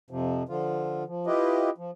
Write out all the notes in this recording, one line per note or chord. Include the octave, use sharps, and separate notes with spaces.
F2 C3 F3
D3 F3 F4
F3
E4 F4 G4 B4 D#5
F3